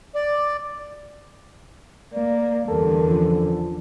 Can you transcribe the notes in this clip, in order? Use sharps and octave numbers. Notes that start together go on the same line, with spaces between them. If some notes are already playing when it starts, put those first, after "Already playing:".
D5
A#3 D5
E2 G2 D3 A4 A#4
F3 C#4